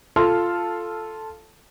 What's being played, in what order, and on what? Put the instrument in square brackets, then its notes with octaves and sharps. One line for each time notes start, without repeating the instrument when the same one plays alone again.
[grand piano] F4 A4 A5 C6 F6